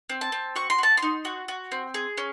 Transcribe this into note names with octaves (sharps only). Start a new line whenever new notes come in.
C4
A5
C4
F#4 C#6
C6
F#4 A5
C6
D#4
F#4
F#4
C4
G#4
C#4